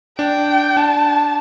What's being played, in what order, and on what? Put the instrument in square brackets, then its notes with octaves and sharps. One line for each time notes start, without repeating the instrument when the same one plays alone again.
[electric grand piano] D4 [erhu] G5
[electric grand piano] D4 [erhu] A5